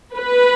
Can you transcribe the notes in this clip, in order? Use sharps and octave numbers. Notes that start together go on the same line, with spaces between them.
B4